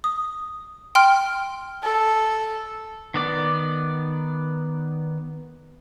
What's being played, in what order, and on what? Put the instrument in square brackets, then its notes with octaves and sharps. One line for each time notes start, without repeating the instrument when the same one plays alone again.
[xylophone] D#6
G5 C6 F6
[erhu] A4
[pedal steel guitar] D#3 B3 D5